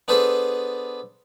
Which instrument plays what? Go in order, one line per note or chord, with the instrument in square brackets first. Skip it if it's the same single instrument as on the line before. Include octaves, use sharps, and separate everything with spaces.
[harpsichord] B3 D4 G#4 A4 B4 C5